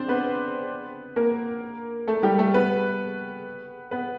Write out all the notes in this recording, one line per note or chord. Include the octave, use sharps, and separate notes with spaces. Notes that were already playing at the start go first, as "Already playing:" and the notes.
Already playing: C4 D4 C5 D5
B3 B4
A#3 A#4
A3 A4
G3 G4
A3 A4
B3 B4
B3 B4